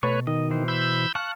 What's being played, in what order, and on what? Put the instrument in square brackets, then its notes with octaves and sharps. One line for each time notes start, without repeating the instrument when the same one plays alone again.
[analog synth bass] B2 [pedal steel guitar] A3 C#6 [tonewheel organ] B4 C#5
[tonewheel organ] D#3 [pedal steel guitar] D#5
[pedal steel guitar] E3 C5
[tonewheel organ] B5 E6 G6
[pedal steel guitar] F5 A5 C#6 [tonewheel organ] F#6